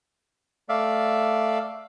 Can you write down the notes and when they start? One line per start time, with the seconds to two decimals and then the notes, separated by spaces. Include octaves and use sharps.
0.69 A3 D5 E5 F5